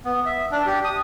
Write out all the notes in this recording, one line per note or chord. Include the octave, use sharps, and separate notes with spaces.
B3
E5
D4
G4
D#6